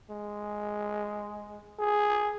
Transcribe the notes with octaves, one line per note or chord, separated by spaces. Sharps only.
G#3
G#4